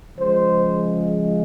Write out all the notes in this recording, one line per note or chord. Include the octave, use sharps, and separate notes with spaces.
C#3 F3 G#3 C5